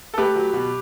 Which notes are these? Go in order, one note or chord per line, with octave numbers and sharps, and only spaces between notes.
A4
A3 G4 B4
F#3
B2